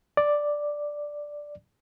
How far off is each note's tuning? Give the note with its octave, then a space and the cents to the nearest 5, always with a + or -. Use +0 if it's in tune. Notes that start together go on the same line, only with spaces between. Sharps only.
D5 +0